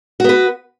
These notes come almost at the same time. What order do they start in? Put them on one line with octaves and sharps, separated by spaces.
F#4 B3 B4